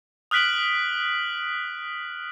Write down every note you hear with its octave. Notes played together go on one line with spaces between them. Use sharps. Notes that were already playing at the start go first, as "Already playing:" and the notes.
D#6 F6 F#6 B6 D7 F#7